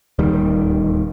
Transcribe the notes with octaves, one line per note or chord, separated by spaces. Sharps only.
D1 D#2 D#3 G3